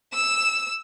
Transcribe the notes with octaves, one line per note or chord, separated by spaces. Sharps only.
E6 E7